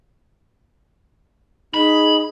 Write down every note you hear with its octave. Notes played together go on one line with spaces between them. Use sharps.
D#4 G#4 B5